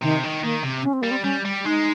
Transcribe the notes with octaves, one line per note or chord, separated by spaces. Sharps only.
C3 D#3
D#3
D#3 A#3
C3
C#4
C4
G3 A#3
C4
G3 C#4
G3
G#3 D#4